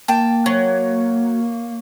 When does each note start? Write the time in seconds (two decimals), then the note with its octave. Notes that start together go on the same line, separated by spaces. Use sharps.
0.08 A#3 G5 A5
0.46 F#3 C#5